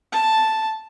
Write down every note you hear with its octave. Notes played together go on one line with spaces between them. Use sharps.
A5